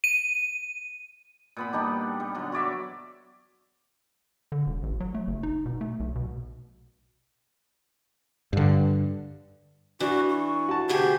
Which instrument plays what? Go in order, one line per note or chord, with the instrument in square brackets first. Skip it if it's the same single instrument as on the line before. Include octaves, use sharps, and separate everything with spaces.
[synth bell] D#7
[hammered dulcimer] A#2 B3 B5
G3 D4 D#4 G4
G3
D3 F#3
F#4 C#5 D5 E5
[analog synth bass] D3
E1
A1
F#3
A3
F#1
D#4
B2
A3
B1
B2
[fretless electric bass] G2 D3
[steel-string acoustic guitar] E3 [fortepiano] D4 [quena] F#4
[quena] C#6
[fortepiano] F#4 A5
[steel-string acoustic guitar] D2 B2 G#4 [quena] G4